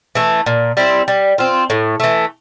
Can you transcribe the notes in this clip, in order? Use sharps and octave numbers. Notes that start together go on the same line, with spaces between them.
E3 A3
A#2
G3 C4 E4
G3
C4 F4
A2
E3 A3